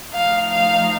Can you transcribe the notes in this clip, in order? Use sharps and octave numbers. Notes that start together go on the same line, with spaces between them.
F3 A3 D#4 F5
F5